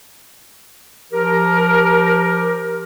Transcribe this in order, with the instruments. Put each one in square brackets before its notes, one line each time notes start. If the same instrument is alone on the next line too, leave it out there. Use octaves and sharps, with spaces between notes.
[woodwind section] F3 G4 A#4